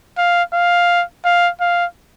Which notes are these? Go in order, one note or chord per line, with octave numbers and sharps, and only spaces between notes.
F5
F5
F5
F5